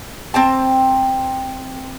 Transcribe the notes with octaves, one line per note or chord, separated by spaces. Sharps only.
C4 G5 A5